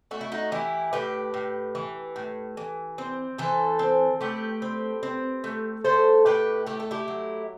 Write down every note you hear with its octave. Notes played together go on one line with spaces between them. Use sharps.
A3 F#4
E4
D#4 F#4
E3 E4 G4
A2 G4 B4
A2
E3
A2
E3
C4
E3 A4 C5
C4
A3 G4 B4
C4
C4
A3
A3 A4 C5
A2 G4 B4
A3 G4
A4
E4 G4
F#3